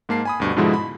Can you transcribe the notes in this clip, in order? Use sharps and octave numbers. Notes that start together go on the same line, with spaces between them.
G#2 A#3 A5 C7
G#5 B5 D#6
D2 G2 B2
G#2 B2 D3 F3 G#3 E4
B5